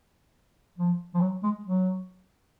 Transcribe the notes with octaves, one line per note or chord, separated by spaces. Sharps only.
F3
F3
F#3
G#3
F#3